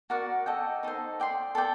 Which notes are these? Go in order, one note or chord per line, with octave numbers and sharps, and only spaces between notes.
F#4 A#4 D5 F#5
A4 D#5 G5
D#4 A4 C5
D5 G5 C6
A4 D5 G5